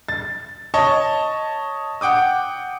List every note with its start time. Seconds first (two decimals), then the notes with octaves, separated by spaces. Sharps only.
0.09 A6
0.74 C#5 D#5 A5 C#6
2.01 F#5 G5 D6 D#6